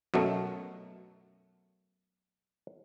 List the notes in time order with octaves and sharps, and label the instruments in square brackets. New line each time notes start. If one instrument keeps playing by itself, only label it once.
[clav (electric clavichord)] F#2 B2 F#3 A3